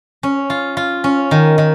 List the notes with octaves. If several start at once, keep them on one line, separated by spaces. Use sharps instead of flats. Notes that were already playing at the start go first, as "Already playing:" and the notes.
C#4
F4
F4
C#4
D#3
D#3